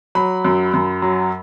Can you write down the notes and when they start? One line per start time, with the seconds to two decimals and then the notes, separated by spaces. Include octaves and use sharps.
0.15 F#3 B5
0.44 F#2
0.74 F#2
1.02 F#3